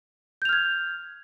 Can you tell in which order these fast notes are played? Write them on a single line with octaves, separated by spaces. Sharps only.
G6 F7 F6 G#6